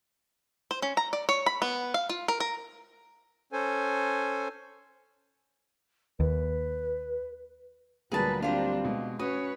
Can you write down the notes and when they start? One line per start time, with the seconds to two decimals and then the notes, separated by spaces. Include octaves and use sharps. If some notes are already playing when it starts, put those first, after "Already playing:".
0.71 C5
0.82 C#4
0.97 A#5
1.13 D5
1.29 C#5
1.46 B5
1.62 B3
1.94 F5
2.09 F4
2.28 A#4
2.40 A#4
3.53 C#4 A4 C5 G#5
6.20 D#2 B4
8.12 D2 A#2 F#3 G3 A#3 G#4 B4 A5
8.43 G3 C4 D4 F4 G4
8.85 B2 G#3
9.19 C#4 F#4 B4 C#5 D#6